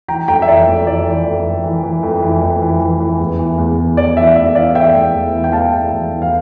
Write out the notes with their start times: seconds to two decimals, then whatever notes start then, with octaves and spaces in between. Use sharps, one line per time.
0.08 E3 G5 A#5
0.28 F2 G5 A#5
0.42 E5
0.47 E3 D5
0.67 F2
0.86 E3 D5
1.06 E3
1.25 F2
1.44 F2
1.64 E3
1.83 E3
2.03 F2
2.22 E3
2.42 F2
2.62 E3
2.81 E3
3.00 E3
3.19 E2
3.39 E3
3.58 E2
3.78 E3
3.97 E3 D5
4.17 E3 E5
4.36 E2 E5
4.55 E3 D5 F5
4.75 E3 E5 G5
4.94 E2
5.14 E2
5.33 E3
5.44 G5
5.53 E2 F5 A5
5.72 E2
5.92 E2
6.11 E3
6.22 F5